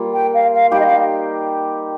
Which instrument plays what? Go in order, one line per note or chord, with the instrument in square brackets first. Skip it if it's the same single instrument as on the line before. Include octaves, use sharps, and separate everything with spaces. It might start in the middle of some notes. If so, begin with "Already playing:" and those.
Already playing: [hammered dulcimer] G3 A#3 F4
[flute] G5
F5
F5
[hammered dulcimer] G3 D#4 G4 [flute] G5
[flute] D#5
F5